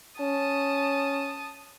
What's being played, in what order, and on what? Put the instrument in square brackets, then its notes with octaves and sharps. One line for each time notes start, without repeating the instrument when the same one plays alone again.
[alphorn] C#4 [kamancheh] A5 D#6